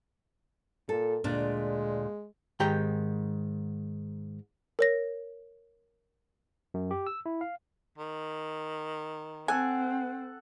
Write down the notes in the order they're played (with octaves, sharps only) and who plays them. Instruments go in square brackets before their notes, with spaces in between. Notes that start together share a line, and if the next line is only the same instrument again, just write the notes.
[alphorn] A#2 [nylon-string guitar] A4
[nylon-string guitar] D2 A#2 D4 [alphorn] G#3
[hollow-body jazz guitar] G#2 D#3 G4 G5 A#5
[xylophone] A#4 C#5 A#6
[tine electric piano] F#2
G4
E6
E4
F5
[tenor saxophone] D#3
[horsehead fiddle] C4 [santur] A4 F#5 [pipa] G#5